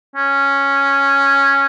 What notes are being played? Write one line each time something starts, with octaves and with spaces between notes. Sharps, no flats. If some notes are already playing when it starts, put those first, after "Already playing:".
C#4